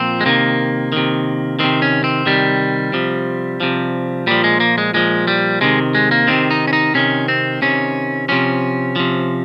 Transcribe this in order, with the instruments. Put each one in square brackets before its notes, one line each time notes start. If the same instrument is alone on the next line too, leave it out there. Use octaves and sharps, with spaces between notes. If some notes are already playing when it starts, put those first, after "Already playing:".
Already playing: [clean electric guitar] A#2 F3 C4
G#3
C3 D#3 A#3
C3 D#3
C3 D#3 C4
C#4
C4
C3 D#3 G3
C3 F3
C3 F3
A#2 F3 G3
G#3
A#3
G#3
A#2 F3 G#3
G3
C3 D#3 G#3
G#3
A#3
C3 D#3 C4
D#4
C#4
D#4
C3 D#3 C#4
C4
C3 D#3 C#4
C3 F3 C#4
C3 F3